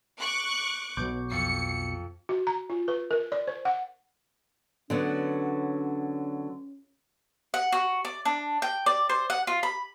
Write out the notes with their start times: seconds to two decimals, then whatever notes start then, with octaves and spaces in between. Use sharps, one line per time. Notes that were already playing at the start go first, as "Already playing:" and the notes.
0.19 C#6 D6 F#6
0.97 B1 B2 F#3 C#6 D6 G6
1.31 F2 C#7
2.29 F#4
2.47 A#5
2.70 F4
2.88 B4
3.11 A#4
3.32 D5
3.47 C5
3.65 F#5
4.90 D3 F#3 B3 C#4
7.54 F#5
7.72 F#4
8.05 D5
8.25 D4
8.62 G5
8.86 D5
9.09 C5
9.30 F#5
9.47 F4
9.63 B5